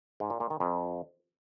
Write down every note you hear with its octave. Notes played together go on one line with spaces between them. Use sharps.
G#2
A#2
A#2
D#3
F2